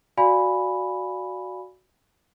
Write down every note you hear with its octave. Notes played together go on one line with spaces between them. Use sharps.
F#4 D5 F5 G#5 B5